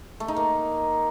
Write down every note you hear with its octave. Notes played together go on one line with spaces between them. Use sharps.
A3
D#4
A#3